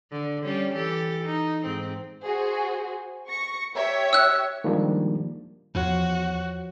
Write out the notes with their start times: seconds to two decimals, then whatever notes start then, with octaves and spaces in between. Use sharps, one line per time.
0.11 D3
0.44 G3 C#4
0.75 E3 G4 A4
1.24 D#4
1.65 G#2 C4
2.21 F#4 G#4 C5
3.29 C#6 A#6 C#7
3.74 G4 C#5 E5
4.13 E6 F#6
4.64 D#3 F3 G3 G#3 A#3 D4
5.75 E2 F3 F#4 C#5 C7